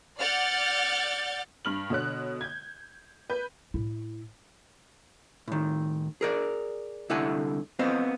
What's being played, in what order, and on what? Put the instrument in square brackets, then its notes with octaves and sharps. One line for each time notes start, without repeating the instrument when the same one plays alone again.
[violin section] D5 F#5 F6 G6 A6
[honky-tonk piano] G2 F6 F#7
B2 D3 C#5 F#6
G6 G#6
B4 G6
[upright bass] A2 E4
[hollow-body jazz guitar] A2 D#3
G#4 A#4 D5
C2 D3 E4 A4 F#5 G#5
B3 C4 C5 D#5 F5